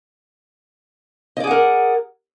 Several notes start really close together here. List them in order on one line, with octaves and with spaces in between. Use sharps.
D#5 D5 G#4 F#5 A#4